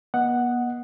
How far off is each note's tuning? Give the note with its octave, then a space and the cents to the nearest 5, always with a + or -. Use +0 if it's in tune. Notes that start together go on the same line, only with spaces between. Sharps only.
B3 -40 D#5 +0 F#5 +0